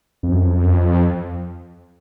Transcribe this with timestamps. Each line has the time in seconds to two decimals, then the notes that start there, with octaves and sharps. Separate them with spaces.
0.23 F2
0.32 F#2
0.41 F2
0.65 F#2
0.70 F2